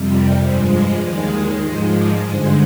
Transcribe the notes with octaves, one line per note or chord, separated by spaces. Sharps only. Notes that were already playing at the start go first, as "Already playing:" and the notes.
Already playing: F2 C3 G3
A#4 D5
G2 F3 G#3 G#4 C5
C5 D#5
D#2 D#3 G#3 D5 F5
G#2 F3 G#3 C5 D#5
A#4 D5
G2 D3 G#3 G#4 C5